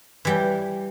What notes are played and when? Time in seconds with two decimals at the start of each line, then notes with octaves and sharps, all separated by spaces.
0.25 E3 G3 G5